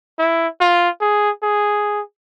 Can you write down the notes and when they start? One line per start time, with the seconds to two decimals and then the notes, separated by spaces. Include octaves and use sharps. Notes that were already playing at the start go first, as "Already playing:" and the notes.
0.19 E4
0.60 F4
1.01 G#4
1.43 G#4